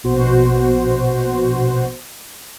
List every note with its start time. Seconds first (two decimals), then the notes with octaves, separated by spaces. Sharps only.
0.04 A#1 B2 F#4 C5